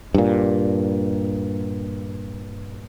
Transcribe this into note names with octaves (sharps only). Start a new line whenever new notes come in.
G2 A#2